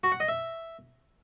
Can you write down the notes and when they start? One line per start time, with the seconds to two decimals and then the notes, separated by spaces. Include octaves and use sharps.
0.03 F#4
0.12 F#5
0.20 D#5
0.28 E5